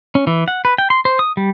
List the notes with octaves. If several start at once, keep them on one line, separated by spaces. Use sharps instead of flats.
C#4
E3
F#5
B4
G5
C6
C5
D#6
G3